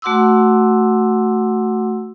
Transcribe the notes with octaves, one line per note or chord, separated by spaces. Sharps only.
A3 F#4 F#5 C6 D6 E6